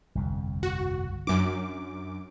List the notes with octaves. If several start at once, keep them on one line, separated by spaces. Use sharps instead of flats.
G1 C2 F2
F#4
F#2 D4 D6